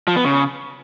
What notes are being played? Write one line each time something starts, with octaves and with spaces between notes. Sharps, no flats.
F3
B3
C#3